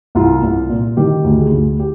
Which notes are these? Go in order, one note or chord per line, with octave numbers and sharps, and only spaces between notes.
C2 F4
C2
A#2
D#3 G4
D2
G#4
D2
G4